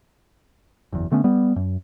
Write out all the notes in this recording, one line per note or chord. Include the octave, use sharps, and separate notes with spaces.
F#1 E2
D3 A3 B3 C#4
G3 B3
F#2